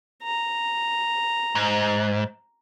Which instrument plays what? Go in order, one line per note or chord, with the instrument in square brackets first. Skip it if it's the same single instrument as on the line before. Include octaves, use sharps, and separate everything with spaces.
[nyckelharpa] A#5
[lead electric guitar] G#2